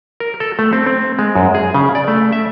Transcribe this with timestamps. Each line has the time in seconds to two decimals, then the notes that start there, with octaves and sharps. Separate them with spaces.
0.20 A#4
0.40 A4
0.59 A3
0.73 C4
0.87 C4
1.19 G#3
1.35 F#2
1.55 G#4
1.74 C#3
1.95 D5
2.08 A3
2.32 E5